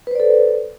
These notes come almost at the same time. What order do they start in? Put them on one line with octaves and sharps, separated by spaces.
B4 C5 D5 A4